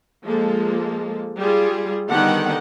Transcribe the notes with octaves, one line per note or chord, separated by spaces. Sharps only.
F3 G#3 A#3 A4
G3 F4 G#4
D3 D#3 G3 B3 F#5 G5